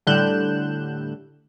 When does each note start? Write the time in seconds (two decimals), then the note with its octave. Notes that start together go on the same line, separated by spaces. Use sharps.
0.07 A2 D3 G3 F#6 G6 E7